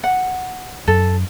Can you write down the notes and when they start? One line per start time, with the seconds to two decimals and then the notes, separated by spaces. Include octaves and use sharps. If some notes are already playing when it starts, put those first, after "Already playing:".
0.04 F#5
0.88 F#2 A4